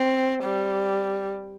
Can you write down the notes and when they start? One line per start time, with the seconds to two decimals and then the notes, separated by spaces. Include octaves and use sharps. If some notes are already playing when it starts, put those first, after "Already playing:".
Already playing: C4
0.43 G3